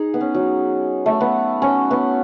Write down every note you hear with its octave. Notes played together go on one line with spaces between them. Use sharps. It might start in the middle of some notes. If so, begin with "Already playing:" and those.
Already playing: D#4 G#4
B3
C#4
F#3
A3
B3
C#4
B3